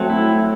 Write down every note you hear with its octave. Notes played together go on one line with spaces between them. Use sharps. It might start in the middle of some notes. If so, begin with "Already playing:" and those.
Already playing: F#3 A3 C4
E4